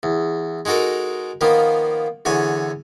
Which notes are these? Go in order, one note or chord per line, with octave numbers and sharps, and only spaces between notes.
E2
G#3 D#4 F#4 A4 A#4
D#3 F3 A#3 B3
E2 D3 C#5 G#5